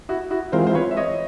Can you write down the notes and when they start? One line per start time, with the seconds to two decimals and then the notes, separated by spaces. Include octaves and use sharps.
0.09 E4 F#4
0.31 E4 F#4
0.52 E3 G#3 C4 F4 A#4 C5
0.67 C5
0.75 B4 C#5
0.91 E5
0.97 C#5 D#5